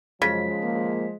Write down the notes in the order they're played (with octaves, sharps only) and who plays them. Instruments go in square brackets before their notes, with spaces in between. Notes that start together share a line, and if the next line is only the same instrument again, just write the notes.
[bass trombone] F#2 [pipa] C#3 [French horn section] F3 G#3 [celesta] B6
[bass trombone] A#3